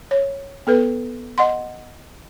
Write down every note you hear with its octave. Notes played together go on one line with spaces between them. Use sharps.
C#5
B3 A4 B4
D#5 F#5 C6